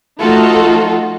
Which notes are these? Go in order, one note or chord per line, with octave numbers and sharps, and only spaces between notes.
F3 A3 D#4 F4 F#4 A4